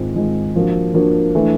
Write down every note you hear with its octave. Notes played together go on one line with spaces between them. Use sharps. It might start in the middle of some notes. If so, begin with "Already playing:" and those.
Already playing: G#2 D#3 G#3 C4 F4
G#2 D#3 G#3 C4 F4
F3 A#3 D4 F#4
F3 A#3 D4 F#4
E3 A3 D4